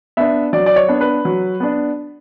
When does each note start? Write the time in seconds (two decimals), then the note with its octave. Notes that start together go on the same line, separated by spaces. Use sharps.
0.17 B3 D4 E5
0.53 F#3 D5
0.66 D5
0.76 C#5
0.88 B3 D4
1.01 B4
1.25 F#3
1.60 B3 D4